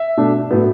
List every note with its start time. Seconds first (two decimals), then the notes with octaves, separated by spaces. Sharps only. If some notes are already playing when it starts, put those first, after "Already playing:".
Already playing: E5
0.17 B2 A3 D4
0.51 A2 F#3 B3